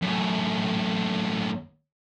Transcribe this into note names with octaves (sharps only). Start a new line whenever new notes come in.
F#2 A2